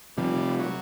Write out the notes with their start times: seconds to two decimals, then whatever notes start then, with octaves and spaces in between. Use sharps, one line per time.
0.18 C3 F3 G3
0.59 F#3